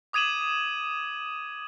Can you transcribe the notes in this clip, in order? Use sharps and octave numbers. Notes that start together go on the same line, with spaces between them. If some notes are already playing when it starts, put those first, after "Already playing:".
D6 D#6 G#6 D#7 E7 F#7